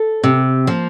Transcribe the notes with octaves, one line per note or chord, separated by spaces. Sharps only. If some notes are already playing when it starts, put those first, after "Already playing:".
Already playing: A4
C3
F3 A#3